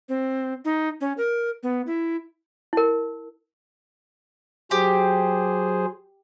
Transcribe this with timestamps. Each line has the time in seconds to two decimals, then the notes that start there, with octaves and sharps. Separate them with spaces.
0.09 C4
0.65 D#4
1.01 C#4
1.18 A#4
1.63 B3
1.87 E4
2.73 E4 A#4
4.71 F#3 G4 G#4 C5